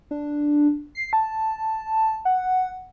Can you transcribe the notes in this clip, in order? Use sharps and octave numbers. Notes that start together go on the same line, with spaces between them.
D4
C7
A5
F#5